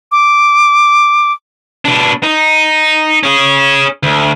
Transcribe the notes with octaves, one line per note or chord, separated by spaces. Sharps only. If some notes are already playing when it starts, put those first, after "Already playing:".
D6
B2 D4
D#4
C#4 G#4
D2